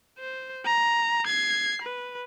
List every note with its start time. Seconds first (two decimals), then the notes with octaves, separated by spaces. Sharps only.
0.19 C5
0.65 A#5
1.26 G#6 C7
1.82 B4